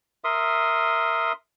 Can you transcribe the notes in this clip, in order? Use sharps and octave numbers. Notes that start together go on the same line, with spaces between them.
A#4 E5 C6 D#6